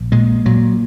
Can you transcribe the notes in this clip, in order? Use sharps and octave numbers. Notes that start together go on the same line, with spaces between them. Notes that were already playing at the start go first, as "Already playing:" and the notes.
Already playing: A#1
A#2 G#3
A#2 F#3